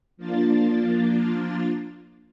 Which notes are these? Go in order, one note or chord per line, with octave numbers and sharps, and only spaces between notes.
F3 A#3 D4 F4 A6